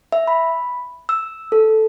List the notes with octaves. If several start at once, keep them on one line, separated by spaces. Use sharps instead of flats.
E5
B5
E6
A4